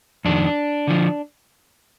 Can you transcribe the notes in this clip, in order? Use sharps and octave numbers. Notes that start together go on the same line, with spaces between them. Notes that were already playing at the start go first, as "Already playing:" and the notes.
F2 D#3 D4
D3 F3